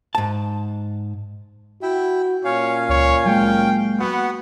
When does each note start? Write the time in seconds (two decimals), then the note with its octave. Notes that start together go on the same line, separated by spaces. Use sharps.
0.15 G#2 A5
1.82 E4 F#4 E5 G5
2.44 A#2 C#4 C#5 F5
2.89 C#2 C#5
3.26 F#3 G#3 A#3 G5
3.99 B3 F#4 F#5